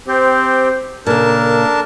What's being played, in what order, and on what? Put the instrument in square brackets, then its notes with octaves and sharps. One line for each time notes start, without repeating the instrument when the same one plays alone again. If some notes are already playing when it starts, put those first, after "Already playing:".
[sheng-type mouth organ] C4 G4 [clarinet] C5
[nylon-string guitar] A#2 C#3 [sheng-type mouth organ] D4 A#4 A5 [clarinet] A4